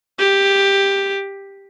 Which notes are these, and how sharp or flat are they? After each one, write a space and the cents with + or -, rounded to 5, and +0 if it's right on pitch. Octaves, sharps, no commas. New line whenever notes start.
G4 +10